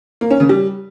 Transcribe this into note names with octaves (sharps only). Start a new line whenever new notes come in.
A#3
C#4
C#3
G3